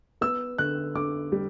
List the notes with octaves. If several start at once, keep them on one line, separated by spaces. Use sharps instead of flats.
B3 E6
D3 F#6
D3 D6
G3